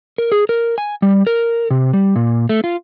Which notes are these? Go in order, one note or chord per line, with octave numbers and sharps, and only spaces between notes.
A#4
G#4
A#4
G#5
G3
A#4
C3
G3
A#2
A3
F4